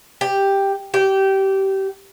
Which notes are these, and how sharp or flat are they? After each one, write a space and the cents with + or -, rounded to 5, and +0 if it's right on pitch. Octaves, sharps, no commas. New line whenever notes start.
G4 +5
G4 -20